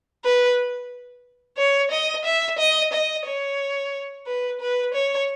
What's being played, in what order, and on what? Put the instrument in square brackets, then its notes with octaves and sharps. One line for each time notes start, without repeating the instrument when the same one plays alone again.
[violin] B4
C#5
D#5
E5
D#5
D#5
C#5
B4
B4
C#5